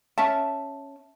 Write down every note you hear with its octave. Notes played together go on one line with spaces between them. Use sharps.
C#4 E5 A5